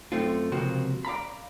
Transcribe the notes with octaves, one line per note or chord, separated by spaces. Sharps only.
F#2 A3 C4 F4
C#2 C3 F3 A#3 F#4
D5 F5 A#5 B5